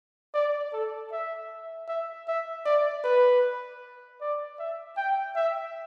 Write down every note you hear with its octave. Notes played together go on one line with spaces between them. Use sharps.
D5
A4
E5
E5
E5
D5
B4
D5
E5
G5
E5